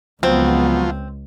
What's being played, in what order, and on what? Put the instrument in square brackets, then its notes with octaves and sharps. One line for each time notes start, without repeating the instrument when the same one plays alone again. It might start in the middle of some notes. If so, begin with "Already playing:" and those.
[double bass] C#2 [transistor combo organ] F3 F#3 F4 [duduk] B3 [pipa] C4